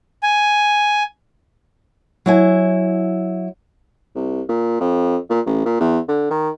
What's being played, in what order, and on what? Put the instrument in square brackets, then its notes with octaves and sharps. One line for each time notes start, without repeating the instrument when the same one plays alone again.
[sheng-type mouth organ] G#5
[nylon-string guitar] F#3 E4 G#5
[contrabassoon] C2
A#2
F2
A#2
A1
A#2
E2
D3
D#3